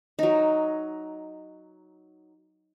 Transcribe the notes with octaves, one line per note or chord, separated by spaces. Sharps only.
F#3 D#4